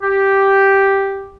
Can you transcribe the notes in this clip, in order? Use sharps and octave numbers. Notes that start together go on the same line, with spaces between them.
G4